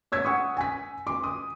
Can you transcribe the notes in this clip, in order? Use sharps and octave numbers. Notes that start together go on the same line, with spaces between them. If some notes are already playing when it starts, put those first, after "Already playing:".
C#5 E6 G#6 B6
F#5 C#6 D#6
G#5 B6
C6 D6
D#6